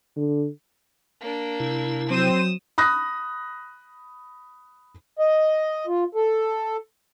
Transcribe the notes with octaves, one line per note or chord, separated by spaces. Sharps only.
D3
A#3 D4
C3 E4
F#3 C4 C5 D#6 D#7 E7
B5 D#6 F#6 A#6
D#5
F4
A4